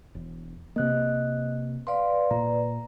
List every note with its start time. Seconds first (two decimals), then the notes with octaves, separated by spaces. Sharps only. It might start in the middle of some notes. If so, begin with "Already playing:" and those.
0.15 E1
0.76 C3 A#3 D#5 F#6
1.87 B4 D5 F5 C6
2.31 A#2 A#5